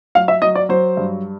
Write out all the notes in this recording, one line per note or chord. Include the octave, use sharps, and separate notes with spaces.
F#3 F5
E5
F#3 D#5
D5
F#3 C5
G2